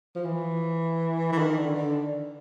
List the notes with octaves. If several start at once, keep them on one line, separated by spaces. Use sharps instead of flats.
F3
E3
E3
D#3
D3
D3